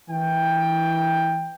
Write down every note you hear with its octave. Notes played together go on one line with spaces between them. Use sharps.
E3 G5